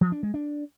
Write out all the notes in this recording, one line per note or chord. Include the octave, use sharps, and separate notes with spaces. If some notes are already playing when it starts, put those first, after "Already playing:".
F3
D4
G#3
D4